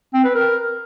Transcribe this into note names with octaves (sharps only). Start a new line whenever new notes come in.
C4
B4
A#4